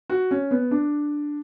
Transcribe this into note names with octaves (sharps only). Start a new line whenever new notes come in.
F#4
C#4
B3
D4